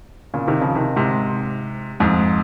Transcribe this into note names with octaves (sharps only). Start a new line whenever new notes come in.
A#2 C#3
C3 D#3
C#3 F3
C3 D#3
G#2 C3
F2 G#2